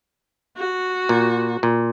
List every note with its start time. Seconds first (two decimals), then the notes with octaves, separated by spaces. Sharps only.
0.57 F#4
1.09 A#2
1.63 A#2